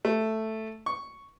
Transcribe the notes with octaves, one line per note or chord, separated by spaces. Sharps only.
A3
C#6